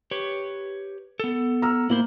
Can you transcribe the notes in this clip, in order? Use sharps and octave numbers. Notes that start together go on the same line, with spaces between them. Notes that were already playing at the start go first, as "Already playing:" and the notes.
G4 B4 C#5
B3 A4
A#5 E6 F6
A2 A#3 E4 C5